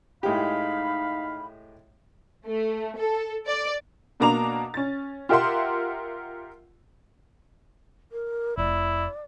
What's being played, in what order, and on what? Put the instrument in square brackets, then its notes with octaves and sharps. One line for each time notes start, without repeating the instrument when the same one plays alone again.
[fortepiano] A2 G#3 G4 [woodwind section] D#4 F5 B5
[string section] A3
A4
D5
[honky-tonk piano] B2 A#3 D4 A#5 D6 F7
C#4 A6
F4 G4 A#4 E5 F#5 C6
[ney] A#4
[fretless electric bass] F1 [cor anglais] E4 [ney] D5